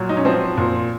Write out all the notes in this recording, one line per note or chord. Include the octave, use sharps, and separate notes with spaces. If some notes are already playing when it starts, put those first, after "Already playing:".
Already playing: A#2 F#3
D#4
C#4
F3 C4
A#2